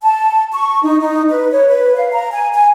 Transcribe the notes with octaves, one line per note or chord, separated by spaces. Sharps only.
A5
C#6
D#4
D#4
B4
C#5
B4
F5
A#5
G#5
G#5